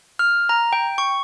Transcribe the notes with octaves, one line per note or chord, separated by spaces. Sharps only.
F6
A#5
G5
C#6